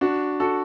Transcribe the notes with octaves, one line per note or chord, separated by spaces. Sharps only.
D4 F#4
F#4 A4